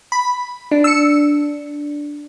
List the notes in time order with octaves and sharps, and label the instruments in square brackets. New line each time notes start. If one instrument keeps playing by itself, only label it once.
[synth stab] B5
[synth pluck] D4
[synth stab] E6 C#7